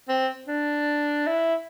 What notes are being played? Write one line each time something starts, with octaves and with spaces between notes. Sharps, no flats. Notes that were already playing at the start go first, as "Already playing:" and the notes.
C4
D4
E4